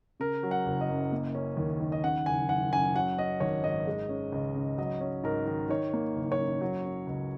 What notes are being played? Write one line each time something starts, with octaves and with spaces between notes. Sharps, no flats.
C#3 A#4
F#3
F#5
F#1
D#5
F#2
A#3
C#4
D#2
D#3
D#5
C#3 F#5
F#1 G#5
F#1 F#5
F#2 G#5
F#3 F#5
C#4 D#5
G#1 C#5
G#2 D#5
G#3
C#4
C#2
C#3
F#3 D#5
C#4
G#2 A#4
D#3
D#3 C#5
A#3
F#1
C#5
F#2
F#3
C#4
C#2